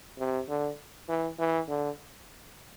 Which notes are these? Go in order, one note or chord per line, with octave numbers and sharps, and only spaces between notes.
C3
D3
E3
E3
D3